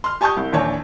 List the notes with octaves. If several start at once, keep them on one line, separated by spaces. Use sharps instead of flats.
C6 F6
G4 G#5 A5 C#6 D#6 G6
C2
A#1 D#2 E3 D4 C#5 A5